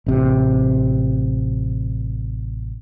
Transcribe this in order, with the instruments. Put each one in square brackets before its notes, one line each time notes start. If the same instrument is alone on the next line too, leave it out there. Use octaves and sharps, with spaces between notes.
[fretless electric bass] A1 C3